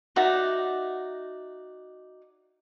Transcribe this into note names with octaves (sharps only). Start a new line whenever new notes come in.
D#4 F#4 D5 E5